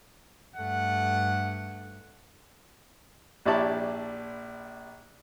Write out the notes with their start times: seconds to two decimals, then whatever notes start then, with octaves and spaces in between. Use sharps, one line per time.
0.56 G2 A3 F#5
3.46 A#1 E4 G4 C#5 D5 A5